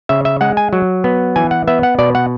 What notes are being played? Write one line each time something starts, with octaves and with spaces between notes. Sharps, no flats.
C#3 E5
E5
G#3 F#5
G#5
F#3
B3
E3 G#5
F#5
B3 E5
F#5
B2 D5
F#5